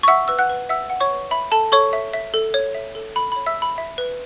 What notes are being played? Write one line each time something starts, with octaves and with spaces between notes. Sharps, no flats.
C#6
E5 F#5 E6
B4 E6
F#5 F#6
B4
E5 F#5 E6
F#5
C#5 C#6
B4
E5 B5
A4 A5
A4 C#5 C#6
E5
E5
A4
C#5
E5
A4
A4 B5
B5
C#5
E5 E6
E5
B5
E5
B4